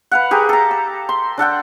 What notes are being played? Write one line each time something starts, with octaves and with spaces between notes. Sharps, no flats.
B4 F5 F#5
G4 G#4 A#4
A4 A#5
E6
C6
D4 A4 F#5 G5